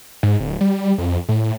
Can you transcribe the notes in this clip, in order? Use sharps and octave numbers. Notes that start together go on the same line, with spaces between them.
G#2
D1
G3
F2
A2